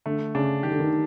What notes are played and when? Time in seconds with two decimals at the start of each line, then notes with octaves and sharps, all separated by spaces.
0.06 D3 A3
0.35 C#3 D4
0.63 D#3 G4
0.71 D3
0.79 D#3